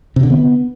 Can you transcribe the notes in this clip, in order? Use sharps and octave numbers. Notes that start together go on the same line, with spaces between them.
C3
D3
B3